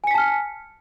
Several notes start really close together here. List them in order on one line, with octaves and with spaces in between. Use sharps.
G#5 C#7 B6 A5 F6